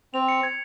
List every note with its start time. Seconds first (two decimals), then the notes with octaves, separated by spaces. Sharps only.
0.14 C4 F7
0.28 C#7
0.43 G#6